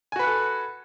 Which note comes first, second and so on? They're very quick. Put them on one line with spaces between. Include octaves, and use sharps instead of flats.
G#5 F#4 B4 F#5 A4